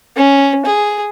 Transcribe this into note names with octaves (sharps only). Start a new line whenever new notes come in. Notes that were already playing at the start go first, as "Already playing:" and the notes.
C#4
G#4